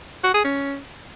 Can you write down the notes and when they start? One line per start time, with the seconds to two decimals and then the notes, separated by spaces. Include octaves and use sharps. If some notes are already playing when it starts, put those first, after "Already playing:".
0.24 F#4
0.34 G#4
0.44 C#4